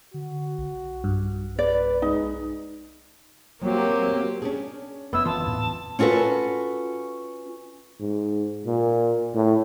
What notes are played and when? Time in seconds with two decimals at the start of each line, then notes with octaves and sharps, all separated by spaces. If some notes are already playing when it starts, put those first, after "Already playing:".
0.14 D3 F#4
0.58 B1
1.04 G2
1.59 B4 D5
2.02 G#3 D#4
3.63 F#3 A#3 C4 G4
4.42 C#4 D4 G#4
5.13 F1 B3 E4 E6
5.25 E3 F4 A5
5.45 D#1 F2 A2
5.99 C#4 F4 F#4 A4 B4
8.00 G#2
8.66 A#2
9.34 A2